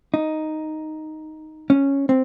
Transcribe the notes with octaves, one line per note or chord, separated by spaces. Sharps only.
D#4
C#4
C4